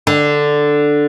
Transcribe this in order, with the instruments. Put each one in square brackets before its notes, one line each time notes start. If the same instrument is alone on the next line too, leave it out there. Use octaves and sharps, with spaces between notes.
[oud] D3